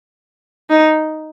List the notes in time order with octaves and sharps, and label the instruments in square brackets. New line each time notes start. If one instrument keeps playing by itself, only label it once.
[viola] D#4